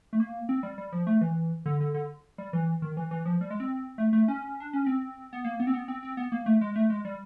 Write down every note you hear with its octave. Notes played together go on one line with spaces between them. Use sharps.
A3
A#3
C4
G3
G3
F3
A3
E3
D3
D3
D3
G3
E3
D#3
E3
E3
F3
G3
G#3
C4
A3
A3
C#4
D4
C#4
C4
B3
A#3
B3
C4
B3
C4
C4
B3
A#3
A3
G#3
A3
G#3
G3